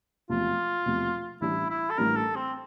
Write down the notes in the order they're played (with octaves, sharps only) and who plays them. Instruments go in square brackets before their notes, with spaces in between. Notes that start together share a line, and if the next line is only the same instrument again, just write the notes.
[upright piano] E1 E2 C3 F3 A3 [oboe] F4
[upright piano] E1 E2 C3 F3 A3
[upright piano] A1 A2 E3 G3 D4 [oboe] E4
[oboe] E4
A4
[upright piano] A1 A2 E3 G3 D4 [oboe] A#4
[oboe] A4
C4